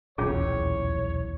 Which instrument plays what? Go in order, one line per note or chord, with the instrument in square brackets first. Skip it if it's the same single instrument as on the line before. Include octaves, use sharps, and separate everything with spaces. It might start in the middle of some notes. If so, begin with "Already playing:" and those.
[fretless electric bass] D#1 B1 E2 [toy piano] C#4 F4 G#4 [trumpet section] C#5